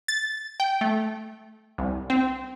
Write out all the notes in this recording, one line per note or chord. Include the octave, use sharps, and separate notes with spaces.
A6
G5
A3
C2
C4